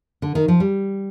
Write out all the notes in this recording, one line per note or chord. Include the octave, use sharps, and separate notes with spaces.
D3
D#3
F3
G3